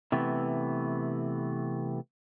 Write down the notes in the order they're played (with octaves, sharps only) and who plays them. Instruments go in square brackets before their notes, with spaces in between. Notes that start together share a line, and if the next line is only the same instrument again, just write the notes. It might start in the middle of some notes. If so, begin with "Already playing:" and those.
[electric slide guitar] C3 E3 A3 B3